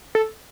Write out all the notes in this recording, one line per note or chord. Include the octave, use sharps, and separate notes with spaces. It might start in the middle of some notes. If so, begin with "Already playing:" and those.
A4